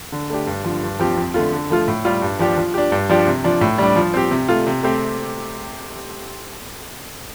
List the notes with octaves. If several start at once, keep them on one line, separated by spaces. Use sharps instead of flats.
D3
A3 D4 G4
G2
D3 F3
G2
F3 C4 G4
F2
D3 A3 F4
D3
F3 A3 F4
A2
G3 F4
G2
F3 D4 G4
F3
D4 G4
G2
F3 D4 G4
C3
F3 D4
A2
G3 D4
F3
C4 G4
C3
A3 F4
C3
A3 C4 G4